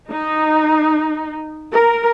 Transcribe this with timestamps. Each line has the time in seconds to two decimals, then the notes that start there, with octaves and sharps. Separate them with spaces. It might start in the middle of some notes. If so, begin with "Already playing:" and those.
0.10 D#4
1.72 A#4